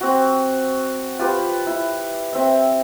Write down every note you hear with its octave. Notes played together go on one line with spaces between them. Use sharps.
C4 F#4
F4 G4 B4
E4
C4 E5